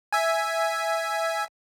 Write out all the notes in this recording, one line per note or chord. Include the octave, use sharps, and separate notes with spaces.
E5 G#5